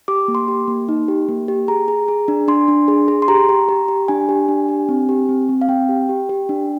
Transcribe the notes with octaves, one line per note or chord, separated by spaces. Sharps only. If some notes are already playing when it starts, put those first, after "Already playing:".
G4 D6
A#3
C6
G4
A#3
D#4
G4
A#3
G4
G#4 A#5
G#4
G#4
D4
D4 C6
D4
G#4
G#4
C6
G4 A#5
G4
G4
G4
D4 G#5
G4
D4
G4
C4
G4
C4
C4
F5
C4 G5
G4
G4
G4
D4